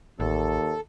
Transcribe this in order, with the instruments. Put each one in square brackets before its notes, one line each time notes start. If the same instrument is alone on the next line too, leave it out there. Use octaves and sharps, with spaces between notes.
[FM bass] A1 [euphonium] D#2 [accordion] A4